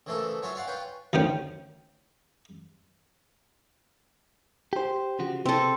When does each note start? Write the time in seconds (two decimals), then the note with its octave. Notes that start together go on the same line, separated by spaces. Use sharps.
0.06 C#3 E3 F3 A3 A4 A#4
0.42 F#3 C#4 F4 C#5 E5
0.55 C#5 D5 F5 F#5
0.67 C#4 F4 B4 G5
1.13 D2 D#3 C#4 C5 G5
4.73 G4 C5
5.19 C#3 F3 F#4
5.45 C3 C4 A4